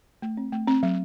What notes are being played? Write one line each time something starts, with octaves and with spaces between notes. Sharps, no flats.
A3
C4
A3
C4
F#3